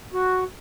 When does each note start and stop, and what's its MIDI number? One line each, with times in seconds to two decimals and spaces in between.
0.13 0.44 66